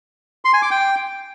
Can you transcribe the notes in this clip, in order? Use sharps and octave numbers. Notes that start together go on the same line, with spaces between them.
C6
G#5
D6
G5